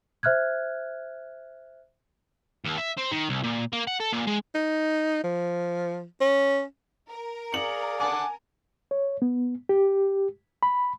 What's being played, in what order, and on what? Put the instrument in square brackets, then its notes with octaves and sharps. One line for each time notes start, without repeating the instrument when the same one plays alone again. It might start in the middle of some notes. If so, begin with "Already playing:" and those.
[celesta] C5 E5 F6 F#6 G#6
[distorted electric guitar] D#2
E5
C4
D#3
C2
A#2
A#3
F#5
A4
A#2
G#3
[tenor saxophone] D#4
F3
C#4
[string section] A#4
[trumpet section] G#4 D5 F5 [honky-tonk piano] C#7 F#7
[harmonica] F#5 A5 D6 [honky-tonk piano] G#5
[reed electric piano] C#5
B3
G4
B5